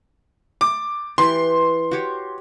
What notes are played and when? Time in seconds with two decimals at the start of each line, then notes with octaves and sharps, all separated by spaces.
0.61 D6
1.18 E3 G4 B4 C6
1.91 F#4 G4 C#5